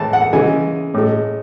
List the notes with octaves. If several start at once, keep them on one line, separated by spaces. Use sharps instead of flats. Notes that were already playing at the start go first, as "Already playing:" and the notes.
Already playing: A2 E3 G#3 A5
F#5
C#3 E3 G#3 G#5
A2 G#3